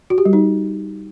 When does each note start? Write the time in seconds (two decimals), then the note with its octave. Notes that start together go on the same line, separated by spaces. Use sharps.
0.10 F#4
0.18 G4
0.25 G3
0.33 D#4